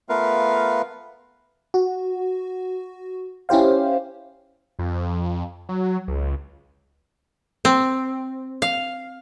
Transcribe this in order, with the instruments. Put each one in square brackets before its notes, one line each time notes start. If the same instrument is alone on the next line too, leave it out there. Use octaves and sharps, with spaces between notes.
[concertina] A3 B3 F4 A#4 B4 F5
[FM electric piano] F#4
C#4 E4 G4 C5 F5
[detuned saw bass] F2
F#3
C#2
[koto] C4
F5